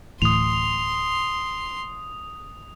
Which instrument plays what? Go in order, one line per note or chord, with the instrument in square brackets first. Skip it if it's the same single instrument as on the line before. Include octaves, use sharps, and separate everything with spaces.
[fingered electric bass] D1 A2 E3 [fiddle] C6 [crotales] D#6 F7